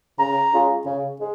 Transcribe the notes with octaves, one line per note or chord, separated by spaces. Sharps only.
C#3 A#5
G#3 C#4 F4
C#3
G#3